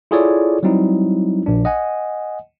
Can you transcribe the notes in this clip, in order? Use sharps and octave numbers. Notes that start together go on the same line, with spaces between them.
E4 F4 G#4 A4 C#5 D5
F#3 G3 C4 D#4 E4
A#1 D4
D#5 F#5 G#5